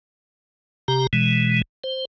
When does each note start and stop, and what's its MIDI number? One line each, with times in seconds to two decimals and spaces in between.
0.88 1.07 48
0.88 1.07 67
0.88 1.07 82
1.13 1.62 47
1.13 1.62 52
1.13 1.62 56
1.84 2.05 72